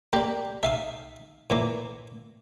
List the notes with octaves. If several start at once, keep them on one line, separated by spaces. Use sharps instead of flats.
A#3 G4 D5
D#4 E5 F5 D#6
A#2 E3 A#3